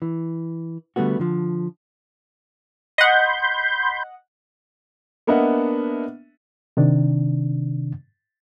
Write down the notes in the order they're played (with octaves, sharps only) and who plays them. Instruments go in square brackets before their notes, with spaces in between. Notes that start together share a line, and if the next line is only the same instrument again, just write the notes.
[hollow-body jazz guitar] E3
D3 G3 A3 B3 F#4
D3 F3
[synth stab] D#5 F#5 [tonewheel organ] B5 C6 G6
[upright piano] A#3 B3 D4 D#5 E5 F#5
[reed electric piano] C3 D#3 D4